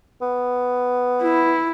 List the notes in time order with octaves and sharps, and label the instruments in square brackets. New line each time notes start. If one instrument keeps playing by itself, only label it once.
[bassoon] B3
[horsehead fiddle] E4